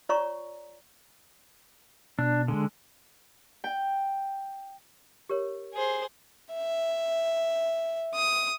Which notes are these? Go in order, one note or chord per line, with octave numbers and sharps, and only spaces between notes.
F4 C#5 D5 A#5 C#6
B2 D4
D3 G#3
G5
G4 A#4 C#5
G#4 C5
E5
D#6